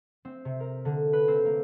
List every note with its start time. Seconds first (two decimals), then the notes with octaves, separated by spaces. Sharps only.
0.25 C4
0.45 C3
0.60 A#4
0.85 D3
1.13 B4
1.28 C4
1.45 A#3